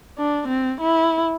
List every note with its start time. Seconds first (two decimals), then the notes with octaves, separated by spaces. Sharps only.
0.18 D4
0.48 C4
0.80 E4